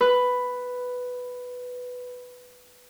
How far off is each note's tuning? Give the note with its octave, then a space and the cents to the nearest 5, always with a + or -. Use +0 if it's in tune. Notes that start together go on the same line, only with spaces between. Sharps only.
B4 +5